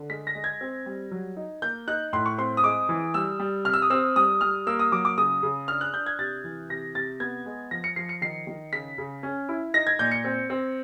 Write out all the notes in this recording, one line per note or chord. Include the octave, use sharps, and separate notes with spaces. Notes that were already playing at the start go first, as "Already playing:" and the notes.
Already playing: D3
G#3 B6
A#6
G#3
G#6
C4
G3
F#3
D#4
A#3 G6
D#4 F#6
A2 C6
C#6
C4 C6
D#6
G#3 D6
E3
G3 E6
G3
C3 F6
E6
D#6
C4 E6
G3 D#6
G3 F6
A#3 E6
D#6
F#3 D6
D6
C#3 D#6
C#3
D4 F6
F#6
D4 G6
G#6
C3 A6
E3
C3 A#6
C3 A6
B3 G#6
G#3
F3 A#6
C#7
F3 C7
C#7
D#3 C7
D#3
C#3 B6
C#3
C#4
E4
D#4 A#6
G#6
A#2 G6
C#7
C4
C4